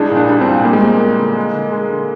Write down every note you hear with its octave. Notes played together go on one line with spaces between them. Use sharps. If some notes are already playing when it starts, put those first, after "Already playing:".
Already playing: C2 G#3 D4 G#4
A#2
D4
G3 D4
C4
A#2
G3 A#3
G#3
A#3 C4
C4
D3
G#3
D3
G#3
D3